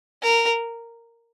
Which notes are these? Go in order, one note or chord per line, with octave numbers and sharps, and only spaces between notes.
A#4